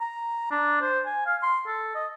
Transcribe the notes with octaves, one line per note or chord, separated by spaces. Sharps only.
A#5
D4
C5
G#5
F5
C6
A4
D#5